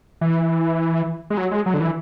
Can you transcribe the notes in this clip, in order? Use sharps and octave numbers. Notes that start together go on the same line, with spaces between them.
E3
G#3
F#3
G#3
F#3
D3
E3